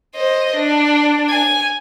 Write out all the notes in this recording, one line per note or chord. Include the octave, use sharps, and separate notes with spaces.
C5 D#5
D4
G#5